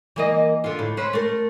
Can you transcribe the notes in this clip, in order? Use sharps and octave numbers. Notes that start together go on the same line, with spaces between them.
E3 A#3 D#5
D3 F4
A2
C#4 B4 C5
A3 A#4